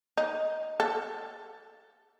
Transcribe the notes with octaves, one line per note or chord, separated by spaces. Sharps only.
D#4
A4